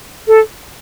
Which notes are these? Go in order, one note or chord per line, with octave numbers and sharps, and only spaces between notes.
A4